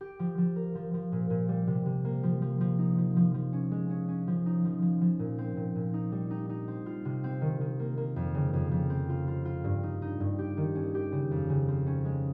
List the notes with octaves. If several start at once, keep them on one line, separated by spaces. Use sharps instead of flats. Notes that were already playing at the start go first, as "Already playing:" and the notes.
G4
F3
F3
A#4
F3
F3
A#2
A#2
G3
C3
C3
A#3
F3
F3
F3
D#4
F3
F3
F3
C#4
G#3
C#4
C#4
F3
D#4
F3
F3
F3
A#2
C4
A#2
A#2
D#4
G3
D#4
D#4
C4
F4
C3
C4
D#3
D#3
A#3
A#3
F2
C#3
F2
F2
C4
F4
F4
F4
G2
D#4
D#4
G2
G4
D#3
C#4
G4
C#3
F2
C#3
C4
C#4
G#3